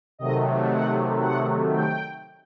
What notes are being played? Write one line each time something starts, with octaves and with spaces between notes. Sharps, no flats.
C3 D#3 F#3 A3 D#5
F#5
F#5
G5